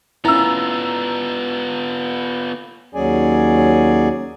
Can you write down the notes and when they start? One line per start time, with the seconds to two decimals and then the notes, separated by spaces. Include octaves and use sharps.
0.25 B3 C#4 E4 F4 A#5 E6
2.95 D#2 F#3 C#4 G#4 D5 G#5